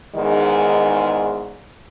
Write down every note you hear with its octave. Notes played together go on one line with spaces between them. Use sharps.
E2 G#2 D#3 G#3